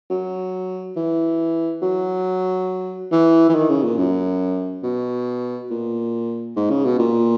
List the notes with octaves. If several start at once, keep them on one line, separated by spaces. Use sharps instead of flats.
F#3
E3
F#3
E3
E3
D#3
C#3
A#2
F#2
B2
A#2
G#2
C#3
B2
A#2